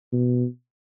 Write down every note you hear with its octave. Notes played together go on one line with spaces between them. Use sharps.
B2